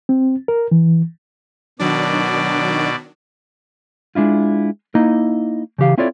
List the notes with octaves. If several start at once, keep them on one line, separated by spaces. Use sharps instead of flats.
C4
A#4
E3
B2 D#3 F#3 D4 D5
G#3 D4 E4 F4
A#3 D#4 E4 D#5
C#3 E3 G4 F5
C4 E4 F4 A4 C#5 D5